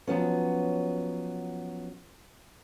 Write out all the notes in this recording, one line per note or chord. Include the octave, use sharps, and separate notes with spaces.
F3 F#3 B3 C#4